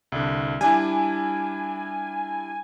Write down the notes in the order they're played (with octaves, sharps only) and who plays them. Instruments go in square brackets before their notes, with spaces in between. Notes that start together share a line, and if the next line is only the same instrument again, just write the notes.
[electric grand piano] C2 D3
[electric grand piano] G3 D4 E4 [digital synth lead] G#5